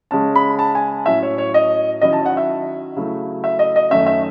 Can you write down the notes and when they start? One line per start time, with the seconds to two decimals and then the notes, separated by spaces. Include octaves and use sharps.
0.11 C#3 G#3 C#4 A5
0.36 B5
0.59 A5
0.75 G#5
1.06 A2 F#3 C#4 E5
1.23 C#5
1.38 C#5
1.54 D#5
2.01 D#3 F#3 C#4 E4 D#5
2.13 A5
2.26 F#5
2.37 E5
2.97 C#3 F#3 A3 E4
3.44 E5
3.59 D#5
3.76 D#5
3.91 F#2 D#3 A3 C#4 E5
4.06 E5